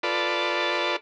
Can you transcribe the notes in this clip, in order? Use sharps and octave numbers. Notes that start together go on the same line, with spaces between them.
F4 A4 B4 D5